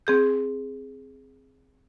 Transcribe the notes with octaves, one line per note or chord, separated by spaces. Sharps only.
C4 G#4 G6